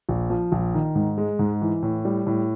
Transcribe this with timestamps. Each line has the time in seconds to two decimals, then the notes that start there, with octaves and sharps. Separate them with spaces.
0.09 A#1
0.30 F3
0.52 A#1
0.74 D#3
0.95 G#2
1.18 G#3
1.39 G#2
1.62 E3
1.83 A2
2.05 G3
2.27 A2